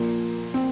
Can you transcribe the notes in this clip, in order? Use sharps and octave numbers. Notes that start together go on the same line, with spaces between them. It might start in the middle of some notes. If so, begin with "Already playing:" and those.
Already playing: A#2 F3 A#3
C4